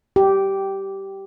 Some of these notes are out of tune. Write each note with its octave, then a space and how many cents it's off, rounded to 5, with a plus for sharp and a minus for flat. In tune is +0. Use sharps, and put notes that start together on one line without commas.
G4 -10